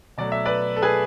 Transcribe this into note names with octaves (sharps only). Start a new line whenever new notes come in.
B2 F#3 A3 D5
E5
B4 D5
A4
G#4 B4